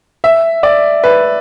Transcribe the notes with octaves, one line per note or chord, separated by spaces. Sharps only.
E5
D5
B4